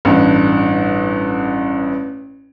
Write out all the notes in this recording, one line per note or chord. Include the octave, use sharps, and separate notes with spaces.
A1 G2